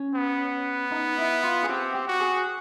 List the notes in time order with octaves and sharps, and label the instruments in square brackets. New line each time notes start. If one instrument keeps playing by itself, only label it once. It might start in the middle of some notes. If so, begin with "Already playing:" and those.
Already playing: [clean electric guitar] C#4
[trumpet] B3
[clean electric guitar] D#4
E4
F4
G#4
[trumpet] C4 [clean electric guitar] G4
[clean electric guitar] G4
[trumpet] F#4
[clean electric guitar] G#4